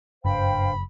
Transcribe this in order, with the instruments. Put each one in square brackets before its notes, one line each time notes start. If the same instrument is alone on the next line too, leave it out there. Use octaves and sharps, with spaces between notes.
[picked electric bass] F#1 [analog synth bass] G2 [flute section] C5 F5 G5 [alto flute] B5